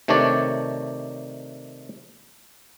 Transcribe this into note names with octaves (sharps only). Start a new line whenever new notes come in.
C3 D#3 A3 D4 C#5 D5